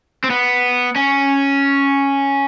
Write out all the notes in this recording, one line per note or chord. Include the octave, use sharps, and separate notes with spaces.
C4
B3
C#4